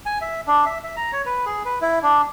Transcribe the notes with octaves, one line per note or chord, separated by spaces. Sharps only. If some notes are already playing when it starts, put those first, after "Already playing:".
G#5
E5
D4
E5
E5
A#5
C#5
B4
G#4
B4
E4
D4